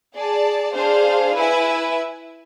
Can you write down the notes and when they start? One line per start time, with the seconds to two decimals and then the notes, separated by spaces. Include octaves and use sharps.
0.15 G#4 D5 A5
0.74 D4 G#4 C5 F5
1.34 E4 B4 E5 G#5